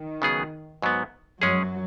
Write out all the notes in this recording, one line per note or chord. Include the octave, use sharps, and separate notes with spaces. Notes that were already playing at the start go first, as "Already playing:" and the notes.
Already playing: D#3
C#3 F#3 B3 G#4
G#2 F#3 B3
F#2 F#3 G#3 C#4 G#4